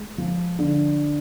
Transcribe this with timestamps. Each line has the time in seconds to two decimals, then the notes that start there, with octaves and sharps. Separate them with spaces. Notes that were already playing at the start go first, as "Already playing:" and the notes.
Already playing: G#3
0.18 F3
0.59 D3